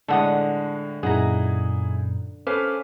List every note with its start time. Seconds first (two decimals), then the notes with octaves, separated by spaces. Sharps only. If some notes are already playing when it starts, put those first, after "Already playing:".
0.08 A2 D3 G#3 A4 F#5 D#6
1.03 F#2 A#2 D#4 E4 G#4 F#5 A#5
2.47 C#4 A4 B4 C5 F5 D6